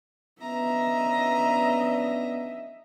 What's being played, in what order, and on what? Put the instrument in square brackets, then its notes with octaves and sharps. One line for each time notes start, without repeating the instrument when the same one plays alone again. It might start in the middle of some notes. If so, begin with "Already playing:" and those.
[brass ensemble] B3 C#4 D4 [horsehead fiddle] D#5 E5 [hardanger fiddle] A#5